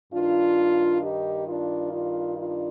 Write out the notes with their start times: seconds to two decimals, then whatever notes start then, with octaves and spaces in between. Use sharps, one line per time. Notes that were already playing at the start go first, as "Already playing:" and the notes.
0.12 G2 D#3 D4 F4
1.02 D#4 G4
1.47 D4 F4
1.92 D4 F4
2.36 D4 F4